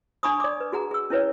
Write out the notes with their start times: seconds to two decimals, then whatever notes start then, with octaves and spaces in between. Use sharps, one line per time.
0.23 D4 G#5 B5 C#6 D#6
0.40 D5 D6
0.60 B4
0.72 F#4 G#4 F#5 A#5
0.91 G#4 E6
1.10 C#4 E4 B4 C#5